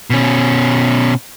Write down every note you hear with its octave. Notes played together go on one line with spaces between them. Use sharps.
B2 C#4